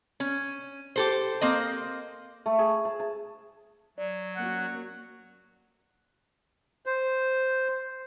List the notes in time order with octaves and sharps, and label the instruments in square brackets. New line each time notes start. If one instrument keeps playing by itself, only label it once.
[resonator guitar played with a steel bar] C#4
G4 A4 C5
A#3 C4 D#5
[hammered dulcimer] A3
G#4
A5
A5
[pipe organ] F#3 [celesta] D5
[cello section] A#3 C#4 F#4 [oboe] F#5
[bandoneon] C5